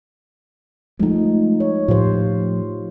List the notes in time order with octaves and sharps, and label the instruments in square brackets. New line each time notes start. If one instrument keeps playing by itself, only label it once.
[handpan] F3 D#4 [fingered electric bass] G#3 A3
[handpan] C#5
[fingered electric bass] A2 F3 [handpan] F4 G4 C5